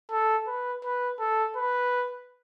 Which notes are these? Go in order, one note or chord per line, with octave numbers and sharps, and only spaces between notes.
A4
B4
B4
A4
B4